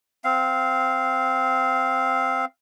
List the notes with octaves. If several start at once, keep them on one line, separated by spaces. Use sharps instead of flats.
C4 F5